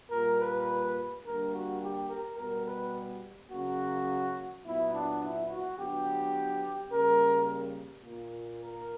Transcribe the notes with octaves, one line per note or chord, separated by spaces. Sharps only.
A#2 G3 A#3 A#4
B4
D3 G3 A#3 A#4
F#4
G4
A#4
B2 G3 B3 A#4
B4
C#3 F#3 A#3 F#4
A#2 F#3 B3 E4
D4
E4
F#4
D3 F#3 B3 G4
C#3 G3 A#3 A#4
A#2 A#3
A#4